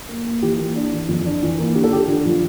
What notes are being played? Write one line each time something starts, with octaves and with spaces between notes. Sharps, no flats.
A#3
A#3
E3 G4
A#3
D4
E3
F2
D4
E3
A#3
D3 G4
A4
D3 G4
D3
F3